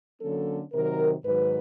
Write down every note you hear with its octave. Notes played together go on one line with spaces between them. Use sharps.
D3 F#3 A#3 C#4 A4
C3 D#3 F#3 A#4
G#2 D#3 F#3 B4